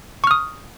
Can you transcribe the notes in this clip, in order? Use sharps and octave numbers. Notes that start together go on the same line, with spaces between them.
C#6 D#6 F6